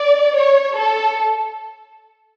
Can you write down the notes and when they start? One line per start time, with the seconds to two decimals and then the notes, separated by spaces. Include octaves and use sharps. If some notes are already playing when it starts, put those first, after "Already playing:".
Already playing: D5
0.36 C#5
0.76 A4